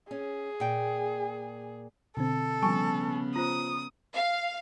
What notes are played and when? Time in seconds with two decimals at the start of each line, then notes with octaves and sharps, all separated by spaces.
0.11 C#4 G#4
0.60 A#2 G5
2.17 B2 D3 C4 A4
2.62 C#3 F3 G3 B3 G#5 A5 C#6
3.36 F4 C5 A#5 D#6
4.13 F5